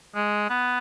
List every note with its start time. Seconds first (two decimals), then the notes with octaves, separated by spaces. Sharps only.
0.15 G#3
0.50 B3